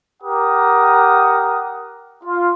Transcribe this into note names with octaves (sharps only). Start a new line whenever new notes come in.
G4 A#4 F#5 D#6
F4